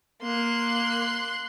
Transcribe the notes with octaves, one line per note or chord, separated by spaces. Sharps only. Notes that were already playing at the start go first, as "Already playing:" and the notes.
A#3 C6 F#6